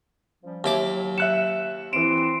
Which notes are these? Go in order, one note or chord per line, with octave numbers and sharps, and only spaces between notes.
F3 G3 C#4
D#2 F#3 E4 D6
E5 F#6 C#7 E7
E3 C4 C6 D7 E7